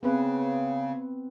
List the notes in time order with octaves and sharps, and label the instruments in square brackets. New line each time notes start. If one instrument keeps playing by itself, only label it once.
[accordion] C#3 [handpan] B3 C4 B4